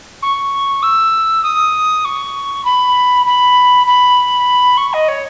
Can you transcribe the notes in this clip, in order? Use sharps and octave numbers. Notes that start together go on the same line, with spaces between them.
C#6
E6
D#6
C#6
B5
B5
B5
C#6
D#5
C#5